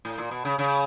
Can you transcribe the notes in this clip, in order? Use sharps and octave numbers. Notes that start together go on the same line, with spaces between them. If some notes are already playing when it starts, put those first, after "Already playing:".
A2
A#2
B2
C#3
C#3